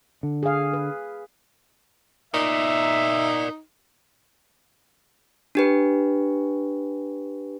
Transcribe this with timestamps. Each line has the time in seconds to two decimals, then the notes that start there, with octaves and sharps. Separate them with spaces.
0.23 D3
0.43 G#4 F5
0.73 B4
2.34 D#4 A#4 D5 E5
5.55 D4 G4 B4